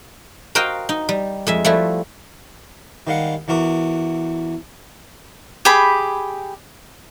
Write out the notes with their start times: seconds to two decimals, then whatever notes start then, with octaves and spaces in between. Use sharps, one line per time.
0.55 F#4 A#4 C5 D#5 F5 G5
0.89 D#4
1.09 G3
1.47 F2 G#3 E5
1.65 F3 G3 A3 E4 F#4
3.07 D#3 G3 G#3 F5 F#5
3.48 E2 E3 F#4 A#4 D6
5.65 G4 G#4 B5